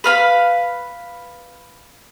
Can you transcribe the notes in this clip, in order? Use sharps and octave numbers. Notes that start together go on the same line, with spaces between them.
B4 F5 B5